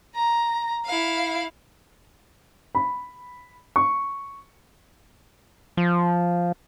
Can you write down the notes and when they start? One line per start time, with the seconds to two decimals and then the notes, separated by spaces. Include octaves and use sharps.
0.15 A#5
0.85 E4 F5
2.75 B5
3.76 C#6
5.77 F3